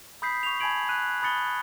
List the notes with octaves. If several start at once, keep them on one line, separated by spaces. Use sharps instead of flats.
B5 D#6 G6 B6 C7
C#6 F7
G#5 A5 B5 G#6 D7 F#7
F#6 D#7
B5 D#6 A6 C#7 G7